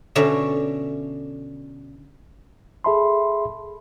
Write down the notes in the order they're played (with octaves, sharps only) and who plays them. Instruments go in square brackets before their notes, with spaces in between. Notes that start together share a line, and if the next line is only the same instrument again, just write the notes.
[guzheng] B2 D3 C#4 E5 A#5
[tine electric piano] G#4 A4 E5 A5 B5 C6